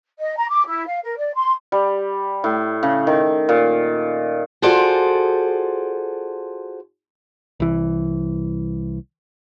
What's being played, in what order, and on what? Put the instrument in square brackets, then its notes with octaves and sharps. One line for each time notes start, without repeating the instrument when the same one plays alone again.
[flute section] D#5
A#5
D6
E4
F5
A#4
D5
C6
[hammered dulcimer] G3
A2
C#3
D#3
A#2
[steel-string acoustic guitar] F4 F#4 G#4 A4 C5 D5
[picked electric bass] C2 E3